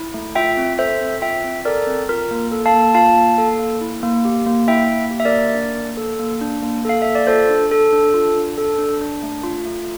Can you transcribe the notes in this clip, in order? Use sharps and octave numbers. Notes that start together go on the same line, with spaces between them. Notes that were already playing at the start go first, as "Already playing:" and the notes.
Already playing: E4
A3
F4 E5 G5
C4
A4 C5 E5
C4
F4 E5 G5
C4
A4 A#4 D5
C4
F4 A#4
A#3
A4
F5 A5
A#3
F4 F5 A5
A#3
A4
A#3
E4
A#3
G4
A#3
E4 E5 G5
A#3
G4
E5
A#4 D5
A#3
D4
A#3
A4
A#3
D4
A#3
A4 F5
A#3 E5
D5
F4 A4 C5
D4
A4
D4
F4
D4
A4
D4
D4
A3
F4
A3